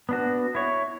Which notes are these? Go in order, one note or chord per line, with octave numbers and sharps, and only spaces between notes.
B3 D4 F#4
E4 C#5